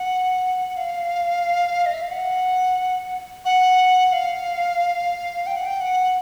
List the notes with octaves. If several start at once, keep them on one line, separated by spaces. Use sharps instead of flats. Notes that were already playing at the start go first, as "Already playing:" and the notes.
Already playing: F#5
F5
D#5
E5
F5
F#5
F#5
F5
G5
F#5
G5
F#5